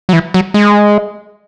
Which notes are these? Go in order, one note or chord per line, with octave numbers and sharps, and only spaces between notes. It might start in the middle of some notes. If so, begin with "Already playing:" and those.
F#3
E3
F#3
G#3